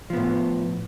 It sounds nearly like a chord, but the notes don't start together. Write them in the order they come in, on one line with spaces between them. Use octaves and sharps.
F3 B3 A2